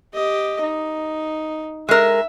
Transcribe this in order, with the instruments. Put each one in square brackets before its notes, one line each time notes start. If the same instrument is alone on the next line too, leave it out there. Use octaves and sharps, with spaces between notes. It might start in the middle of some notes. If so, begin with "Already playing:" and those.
[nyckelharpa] G4 D#5
D#4
[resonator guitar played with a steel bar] G#3 A#4 [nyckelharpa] E5